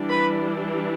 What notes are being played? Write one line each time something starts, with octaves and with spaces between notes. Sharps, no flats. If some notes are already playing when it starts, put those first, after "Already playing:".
Already playing: E3 G3 D4
B4 B5